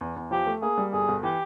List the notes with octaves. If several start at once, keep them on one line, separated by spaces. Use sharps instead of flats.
E2
E2
F3 G4
A3
A#3 G#4
G3
G1 G#4
G1
E3 G4